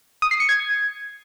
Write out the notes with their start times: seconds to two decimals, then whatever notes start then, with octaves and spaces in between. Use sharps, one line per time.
0.22 D#6
0.31 C7
0.40 C#7
0.49 G#6